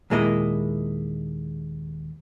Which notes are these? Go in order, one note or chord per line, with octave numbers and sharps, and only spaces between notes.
D#2 A#2 G#3 A#3 E4 D#5